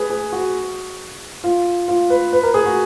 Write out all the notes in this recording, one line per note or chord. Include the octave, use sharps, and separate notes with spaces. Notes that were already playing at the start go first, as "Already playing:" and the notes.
Already playing: G#4 B4
G#4
F#4
F4
F4
B4
B4
A#4
G#4
F#4